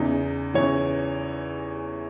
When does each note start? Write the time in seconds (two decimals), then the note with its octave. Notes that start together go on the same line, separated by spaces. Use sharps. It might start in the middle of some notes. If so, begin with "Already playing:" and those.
Already playing: E2 C#3 E3 D#4
0.54 E2 C#3 E3 C#5